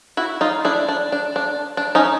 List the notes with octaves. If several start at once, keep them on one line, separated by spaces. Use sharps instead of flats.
E4 F#4
D#4 F4
D4 E4
D4
D4
D4
D4
C#4 D#4